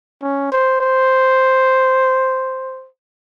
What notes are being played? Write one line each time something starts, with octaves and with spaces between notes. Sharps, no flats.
C#4
C5
C5